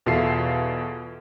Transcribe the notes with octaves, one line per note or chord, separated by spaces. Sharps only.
E2 B2 F4 A4 E5 C7